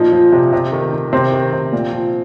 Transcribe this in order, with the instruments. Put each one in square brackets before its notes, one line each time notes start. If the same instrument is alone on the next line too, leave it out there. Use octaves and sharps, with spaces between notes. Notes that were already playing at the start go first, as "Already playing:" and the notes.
Already playing: [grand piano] A#2 F3 D#4
F3
C3
C3
D#3
D#3
C3 C4
D#3
C3
A#2
F3